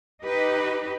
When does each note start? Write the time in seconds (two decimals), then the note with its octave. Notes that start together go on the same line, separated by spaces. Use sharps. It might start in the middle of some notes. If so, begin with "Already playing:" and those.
0.23 D#4 G4 B4